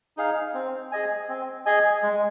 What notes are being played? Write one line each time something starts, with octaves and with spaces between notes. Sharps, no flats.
D#4 G#4 F5
C4
G#4 D#5 G#5
C4
G#4 D#5 G#5
G#3